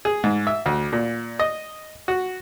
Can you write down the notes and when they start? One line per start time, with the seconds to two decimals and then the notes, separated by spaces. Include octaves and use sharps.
0.05 G#4
0.24 G#2
0.47 E5
0.66 D2
0.93 A#2
1.39 D#5
2.08 F#4